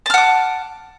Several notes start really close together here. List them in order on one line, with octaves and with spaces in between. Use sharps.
A5 F6 F#5 D6